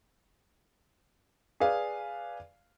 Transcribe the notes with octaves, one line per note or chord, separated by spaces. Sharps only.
G#4 B4 D5 F5